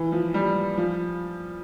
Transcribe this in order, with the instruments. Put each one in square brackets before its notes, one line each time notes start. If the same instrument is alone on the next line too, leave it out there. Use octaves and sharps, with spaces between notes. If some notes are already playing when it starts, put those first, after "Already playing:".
Already playing: [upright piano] E3
F3
G3
F3